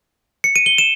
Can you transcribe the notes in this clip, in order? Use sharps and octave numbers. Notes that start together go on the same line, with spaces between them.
C#7
D#7
G7
E7